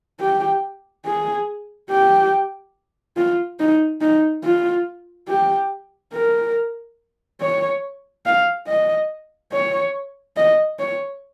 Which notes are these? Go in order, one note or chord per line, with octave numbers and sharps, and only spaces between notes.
G4
G#4
G4
F4
D#4
D#4
F4
G4
A#4
C#5
F5
D#5
C#5
D#5
C#5